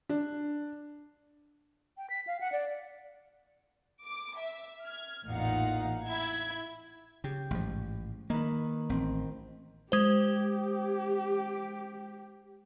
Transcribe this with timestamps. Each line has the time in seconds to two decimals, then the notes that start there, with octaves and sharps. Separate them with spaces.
0.09 D4
1.98 G5
2.10 B6
2.27 F5
2.41 F#5
2.52 D5
4.03 D6
4.38 E5
4.83 F6 G#6
5.27 A1 E2 A#2 D#4 F5 F#5
6.05 E4 G#6
7.24 C#3 G4
7.51 A1 G#2 F3
8.30 D#3 A#3 B4
8.89 A1 C4
9.92 G#3 G4 C5